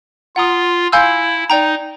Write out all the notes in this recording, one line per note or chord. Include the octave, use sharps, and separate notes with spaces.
F4 F#5 A#5 D#6
E4 F5 G#5 C6 E6 G6
D#4 D5 G5 A#5